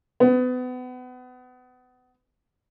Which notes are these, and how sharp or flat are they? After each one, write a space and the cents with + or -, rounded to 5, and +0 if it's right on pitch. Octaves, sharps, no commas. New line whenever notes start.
B3 +30